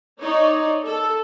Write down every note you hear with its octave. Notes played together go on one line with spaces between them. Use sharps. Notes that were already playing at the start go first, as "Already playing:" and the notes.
D#4 C#5 D5
A4